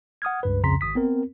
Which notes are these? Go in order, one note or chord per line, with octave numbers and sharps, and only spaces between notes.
F#5 D#6 F6 G#6
C#2 G2 B4
C2 F2 C#3 A#5 C6 B6
G#1 D#6 B6
B3 C4 A#4